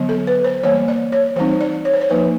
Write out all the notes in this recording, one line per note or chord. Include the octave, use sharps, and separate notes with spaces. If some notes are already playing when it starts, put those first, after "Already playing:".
Already playing: D3 F#3 B3
A4
B4
C5
E3 G3 A#3 C#5
D5
C#5
E3 G3 C4 D#4 C5
D5
C#5
C5
C#5
F3 A#3 D#4 B4